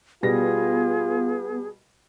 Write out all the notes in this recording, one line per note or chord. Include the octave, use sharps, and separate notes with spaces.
B2 G3 B3 F4 G#4 A#6